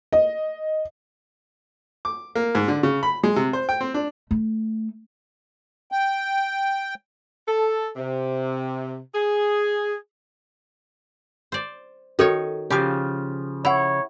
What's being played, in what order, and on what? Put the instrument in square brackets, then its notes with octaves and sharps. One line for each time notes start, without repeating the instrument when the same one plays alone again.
[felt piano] D#5
[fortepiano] D6
A#3
G#2
D3
C#3
B5
G#3
C3
C5
G5
C4
D4
[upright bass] A3
[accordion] G5
[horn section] A4
C3
G#4
[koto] C5 D5
[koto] D#3 D#4 C#5 [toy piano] F#4 A4 A#4
[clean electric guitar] C#3 F3 [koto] G4 F5
[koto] E4 [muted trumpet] C#5 [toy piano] F#5 B5